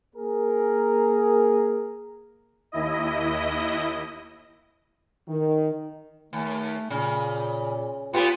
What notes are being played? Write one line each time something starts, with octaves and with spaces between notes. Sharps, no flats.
A#3 G#4 A#4
D#2 E4 D#5
D#3
D#2 A3
A#2 C#3
A2 B3 F4 G4